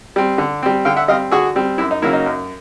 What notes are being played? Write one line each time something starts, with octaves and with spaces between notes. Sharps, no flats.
G3 C4
D3
G3 C4
D3 F5 G5
E5 F#5
G3 C4 D#5 F5
D3 F#4 G#4
G3 C4
F#2 E4
D#4
C#3 F#3 A#3 E4
D#4
F#2